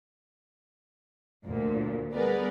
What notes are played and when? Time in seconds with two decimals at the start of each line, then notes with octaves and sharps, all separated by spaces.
1.45 D2 A#2
2.14 G3 B3 G#4 A#4 B4 D5